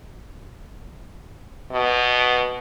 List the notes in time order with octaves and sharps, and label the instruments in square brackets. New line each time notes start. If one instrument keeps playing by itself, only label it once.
[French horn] B2